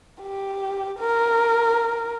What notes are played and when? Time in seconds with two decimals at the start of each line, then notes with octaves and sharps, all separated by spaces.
0.22 G4
0.99 A#4